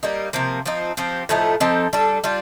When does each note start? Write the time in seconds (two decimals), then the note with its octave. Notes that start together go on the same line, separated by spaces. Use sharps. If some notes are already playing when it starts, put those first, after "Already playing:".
0.03 G3 A#3 D#4
0.33 C3 F3 A#3
0.66 F3 C4 D#4
0.97 F3 C4 G4
1.29 A2 F3 A3 D#4
1.60 F3 C4 D#4 A4
1.93 G3 D4 A4
2.24 G3 D4 F4